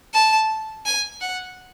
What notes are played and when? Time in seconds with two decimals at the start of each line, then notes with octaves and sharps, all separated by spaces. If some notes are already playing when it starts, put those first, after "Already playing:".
0.14 A5
0.86 G#5
1.21 F#5